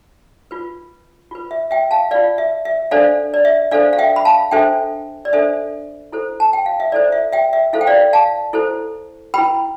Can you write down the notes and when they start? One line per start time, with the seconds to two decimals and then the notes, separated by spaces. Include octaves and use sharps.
0.51 F4 B4
1.31 F4 B4
1.51 E5
1.71 E5 G5
1.91 F5 A5
2.11 F4 B4 D5 F5
2.38 E5
2.65 E5
2.91 D4 A4 C5 D5 F5
3.34 D5
3.45 E5
3.71 D4 A4 C5 D5 F5
3.93 F5
3.99 E5 G5
4.16 B5
4.25 F5 A5
4.51 D4 A4 C5 E5 G5
5.25 D5
5.33 D4 A4 C5 E5
6.12 E4 A4 C5
6.40 A5
6.53 G5
6.66 F5
6.80 E5
6.92 E4 A4 C5 D5
7.12 E5
7.33 E5 G5
7.53 E5
7.73 E4 A4 C5 F5
7.81 G5
7.87 D5 F5
8.13 F5 A5
8.53 E4 A4 C5
9.34 E4 B4 G5 B5